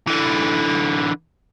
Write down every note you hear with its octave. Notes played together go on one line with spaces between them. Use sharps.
D3 E3